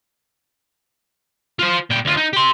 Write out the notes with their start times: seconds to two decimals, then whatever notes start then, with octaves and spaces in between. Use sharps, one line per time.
1.59 F4 C5
1.90 A#2 G5
2.05 D2 F4
2.17 D#4
2.33 G4 C6